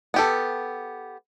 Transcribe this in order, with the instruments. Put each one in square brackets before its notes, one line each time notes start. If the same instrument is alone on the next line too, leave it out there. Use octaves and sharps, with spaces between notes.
[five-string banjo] B3 G4 A4